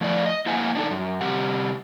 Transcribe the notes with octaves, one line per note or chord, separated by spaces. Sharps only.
F3 A3 E4 D5 F5
D#5
A#3 E4 C5 E5 F#5 G#5
D4 D#4 A4
F#2
C3 G3 G4 F#5